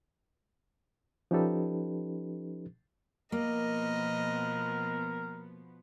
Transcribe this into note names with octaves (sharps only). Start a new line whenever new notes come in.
F3 C#4 D#4 G4 A4 B4
B2 F3 A#3 B3 A#4 D#5